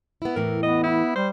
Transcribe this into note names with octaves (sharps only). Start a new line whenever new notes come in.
B3 E4
E2 A2 E3 A#4
B3 D#5
E4
G3 C5